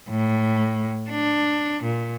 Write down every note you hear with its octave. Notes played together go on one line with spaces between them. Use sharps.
A2
D4
A#2